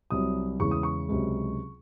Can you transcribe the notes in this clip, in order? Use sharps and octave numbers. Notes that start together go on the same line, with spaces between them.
C2 C3 F#3 D#6
E2 C#3 E3 G#3 C#6
D#6
C#6
C#2 C3 F#3